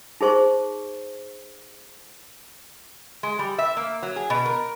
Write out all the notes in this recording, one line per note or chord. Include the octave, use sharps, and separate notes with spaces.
D#4 G#4 C5 C#6
G#3
G3
E5
A#3
F#3
G#4
B2
A#4